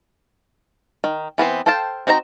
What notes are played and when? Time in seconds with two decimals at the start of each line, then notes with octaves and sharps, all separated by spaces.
1.04 D#3
1.38 E3 B3 C4 C5
1.66 A4 C5 F5 G5 A5
2.07 C4 D#4 F#4 C5 A#5